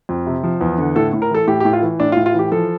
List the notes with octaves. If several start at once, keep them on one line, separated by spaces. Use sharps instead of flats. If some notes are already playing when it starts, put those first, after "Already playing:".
F2
C3
F3
E2
D3
A2 A4
A2
A#4
E3 A4
A2 G4
G4
A2
F4
E3
A2 D4
F4
A2
F4
E3 G4
F3 A4